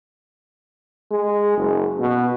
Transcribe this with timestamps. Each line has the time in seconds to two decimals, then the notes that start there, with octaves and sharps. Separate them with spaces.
1.11 G#3
1.57 F#1
1.99 B2